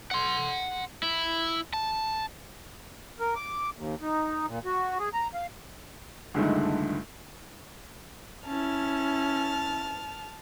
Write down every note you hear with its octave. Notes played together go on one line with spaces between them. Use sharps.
F#5 C6
E4
A5
A#4
D6
D#2
D#4
A#2
F#4
G#4
A#5
F5
C#2 G2 D3 D#3 G#3 A3
C#4 E4 A5 F6